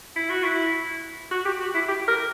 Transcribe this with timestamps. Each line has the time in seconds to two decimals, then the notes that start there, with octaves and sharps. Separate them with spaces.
0.16 E4
0.30 F#4
0.44 E4
1.31 F#4
1.45 G4
1.61 F#4
1.74 E4
1.89 G4
2.08 A#4